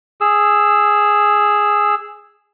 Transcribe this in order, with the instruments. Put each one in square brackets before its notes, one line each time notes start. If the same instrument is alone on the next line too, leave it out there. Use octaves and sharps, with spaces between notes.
[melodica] G#4 E6